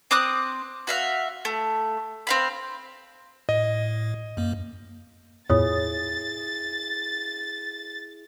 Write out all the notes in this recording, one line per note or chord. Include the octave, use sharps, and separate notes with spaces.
C4 D6 D#6 F#6
F#4 E5 F5
A3
C4 F5 B5
A2 D#5
F#2 A#3
E2 A2 E4 F4 G#4 C#5 D#6 A6